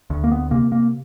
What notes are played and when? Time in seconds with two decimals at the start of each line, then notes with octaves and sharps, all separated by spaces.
0.10 D2
0.24 A#3
0.31 B3
0.51 C3 A#3
0.72 A#3